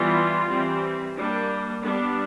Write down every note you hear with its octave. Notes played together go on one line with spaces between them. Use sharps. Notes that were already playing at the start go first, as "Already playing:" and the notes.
Already playing: E3 G3 B3 F4
E3 G3 C4
G3 A#3 D4
G3 B3 D4